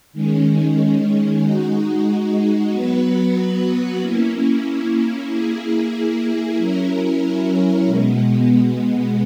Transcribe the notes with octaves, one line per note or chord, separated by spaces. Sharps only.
D#3 G#3 C#4
G#3 D#4 F#4
F#3 B3 F#4 B4
A#3 C#4 E4
A#3 E4 G#4
F#3 C#4 E4 A#4
B2 G#3 B3